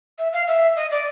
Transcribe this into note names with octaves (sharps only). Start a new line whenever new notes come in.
E5
F5
E5
D#5
D5